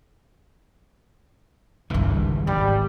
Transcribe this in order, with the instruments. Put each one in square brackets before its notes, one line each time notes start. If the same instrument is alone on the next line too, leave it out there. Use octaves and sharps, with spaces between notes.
[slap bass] G#1 E3 [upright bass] C#2 G2
[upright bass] G#2 [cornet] G3